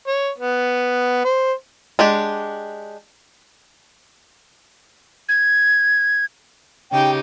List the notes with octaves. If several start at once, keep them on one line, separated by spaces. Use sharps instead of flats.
C#5
B3
C5
G#3 D4 G4
G#6
C#3 D#4 G4 G5